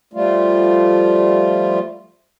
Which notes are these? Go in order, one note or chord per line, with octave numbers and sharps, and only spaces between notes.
F3 G3 A3 F4